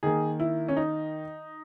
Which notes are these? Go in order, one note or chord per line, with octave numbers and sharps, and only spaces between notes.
D#3 A#3 G#4
E4
C#4
D#4